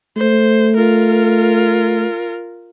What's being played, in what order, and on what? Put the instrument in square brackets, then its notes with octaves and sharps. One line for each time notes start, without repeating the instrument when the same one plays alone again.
[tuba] A3 [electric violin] C5
[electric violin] F4 A#4